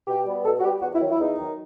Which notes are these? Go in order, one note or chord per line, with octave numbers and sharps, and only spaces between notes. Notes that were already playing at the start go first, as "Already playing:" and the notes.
B2 G4
G3 B3
B2 A4
F#4
G3 B3 G4
E2 F#4
E4
D#3 F#3
E4
E2 D#4
D#3 F#3